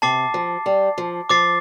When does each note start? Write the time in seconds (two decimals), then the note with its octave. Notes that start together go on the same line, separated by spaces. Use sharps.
0.02 C3 A5 D6 A6 C7
0.34 F3
0.66 G3
0.98 F3
1.30 F3 D6 A6 C7